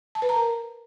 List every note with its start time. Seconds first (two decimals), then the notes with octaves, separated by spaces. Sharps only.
0.15 A5
0.22 B4
0.29 A#5
0.36 A#4